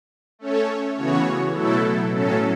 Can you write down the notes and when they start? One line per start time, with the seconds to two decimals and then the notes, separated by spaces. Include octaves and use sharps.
0.39 A3 C#4 A4 C#5
0.96 C#3 E3 B3 F#4 C#5
1.54 B2 F#3 A3 E4 A4
2.12 A2 F#3 C#4 A4